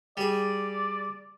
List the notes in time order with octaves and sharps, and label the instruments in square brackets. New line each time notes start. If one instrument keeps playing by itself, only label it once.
[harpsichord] G3 G#4 [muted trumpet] D5